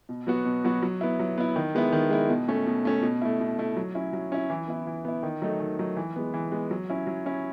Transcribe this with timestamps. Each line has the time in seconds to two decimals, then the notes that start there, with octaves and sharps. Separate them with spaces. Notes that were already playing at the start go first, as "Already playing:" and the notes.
0.09 B2
0.27 F#3 B3 F#4
0.45 B2
0.64 F#3 B3 F#4
0.82 F#3
1.01 B3 E4
1.19 F#3
1.38 B3 E4
1.56 D#3
1.75 G#3 B3 E4
1.92 D#3
2.10 G#3 B3 E4
2.29 B2
2.48 A3 C#4
2.66 B2
2.85 A3 C#4
3.03 B2
3.22 A3 E4
3.40 B2
3.59 A3 E4
3.77 F#3
3.95 C#4 E4
4.13 F#3
4.32 C#4 E4
4.50 E3
4.68 B3 E4
4.87 E3
5.05 B3 E4
5.23 D#3
5.42 F#3 A3 D#4
5.60 D#3
5.78 F#3 A3 D#4
5.96 E3
6.16 G#3 B3
6.34 E3
6.52 G#3 B3
6.71 F#3
6.90 C#4 E4
7.07 F#3
7.26 C#4 E4